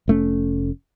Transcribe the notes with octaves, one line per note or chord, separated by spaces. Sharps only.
F1 A3 C#4